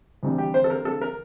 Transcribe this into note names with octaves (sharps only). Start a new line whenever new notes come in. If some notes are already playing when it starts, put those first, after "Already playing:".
D2 C3 E3 G3
G4
C5
A4
A#4
A4
A#4